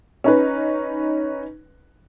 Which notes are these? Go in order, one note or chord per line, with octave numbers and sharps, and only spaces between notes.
C#4 D#4 B4